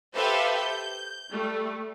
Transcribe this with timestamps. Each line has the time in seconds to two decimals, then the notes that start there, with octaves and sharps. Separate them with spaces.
0.15 G4 A4 B4 C5 E5 F5
0.58 G6
1.30 G3 A3